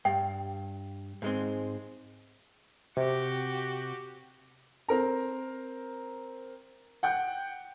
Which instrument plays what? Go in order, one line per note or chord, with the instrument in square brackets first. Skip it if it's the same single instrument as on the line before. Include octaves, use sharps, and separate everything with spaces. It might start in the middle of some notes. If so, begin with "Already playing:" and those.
[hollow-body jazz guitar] G2 [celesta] G5
[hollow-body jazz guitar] G#2 G#3 C4
[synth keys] C3 [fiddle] F#4 G4
[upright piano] C4 A#4 A#5
F#5 G5 G6